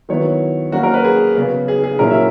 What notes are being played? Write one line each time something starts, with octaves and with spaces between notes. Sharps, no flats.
D#3 F#3 B3 E4 C#5
F#3 A#3 C#4 F#4
A#4
B4
G#4
C#3 F#3 B3
G#4
G#4
A#2 F#3 C#4 E4 A#4
E5